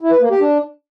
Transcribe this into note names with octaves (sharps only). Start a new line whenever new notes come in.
E4
B4
A#3
G4
D4